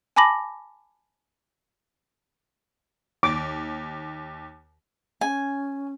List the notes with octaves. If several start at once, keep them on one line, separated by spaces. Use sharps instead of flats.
G#5 A5 B5 D6 A#6 F#7
D#2 D6
C#4 G#5